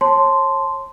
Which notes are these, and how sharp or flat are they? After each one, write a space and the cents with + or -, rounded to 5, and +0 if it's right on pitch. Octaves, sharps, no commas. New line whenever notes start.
C#5 -35 A5 +0 C6 -10